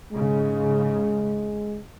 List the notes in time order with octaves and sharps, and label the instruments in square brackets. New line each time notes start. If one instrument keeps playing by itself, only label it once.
[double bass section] G#2 C#3 [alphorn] G#3